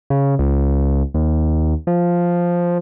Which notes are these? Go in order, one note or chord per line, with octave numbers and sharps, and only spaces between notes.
C#3
C#2
D#2
F3